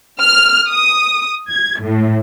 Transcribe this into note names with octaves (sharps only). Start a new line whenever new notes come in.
F6
D#6
G#6
A2